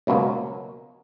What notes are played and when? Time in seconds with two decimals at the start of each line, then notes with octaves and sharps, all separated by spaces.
0.07 C#2 B2 F#3 A#3